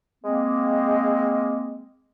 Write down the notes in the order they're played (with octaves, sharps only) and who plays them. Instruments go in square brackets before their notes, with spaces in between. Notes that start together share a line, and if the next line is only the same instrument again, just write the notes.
[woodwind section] G#3 A#3 C4